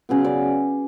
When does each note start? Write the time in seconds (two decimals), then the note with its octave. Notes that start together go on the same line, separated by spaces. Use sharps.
0.09 C#3 F#3 B3
0.24 D5